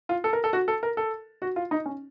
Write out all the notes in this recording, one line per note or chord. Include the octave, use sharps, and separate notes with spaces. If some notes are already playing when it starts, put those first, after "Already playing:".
F4
A4
A#4
A4
F#4
A4
A#4
A4
F#4
F4
D#4
C#4